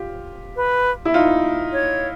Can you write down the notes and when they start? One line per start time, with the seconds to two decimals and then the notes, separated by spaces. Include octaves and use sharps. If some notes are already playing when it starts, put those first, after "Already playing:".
Already playing: F4 G4
0.56 B4
1.05 E4
1.14 D#4 F4
1.73 C#5